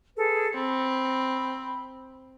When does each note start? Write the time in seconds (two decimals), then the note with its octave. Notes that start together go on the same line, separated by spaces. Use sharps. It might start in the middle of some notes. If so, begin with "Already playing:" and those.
0.15 G#4 A4 B4
0.55 C4 B5